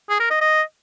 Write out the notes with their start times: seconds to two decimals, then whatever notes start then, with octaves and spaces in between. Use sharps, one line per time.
0.09 G#4
0.20 A#4
0.31 D#5
0.41 D#5